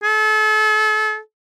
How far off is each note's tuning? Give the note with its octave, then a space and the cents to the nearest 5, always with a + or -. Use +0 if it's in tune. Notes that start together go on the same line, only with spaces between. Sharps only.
A4 -35